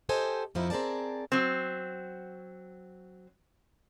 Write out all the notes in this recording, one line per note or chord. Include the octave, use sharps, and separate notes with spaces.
G4 A4 C5 D#5 G#5
F2 F3 D#4 E4
C4 G#4 A#4 D5 A5
F#3 C4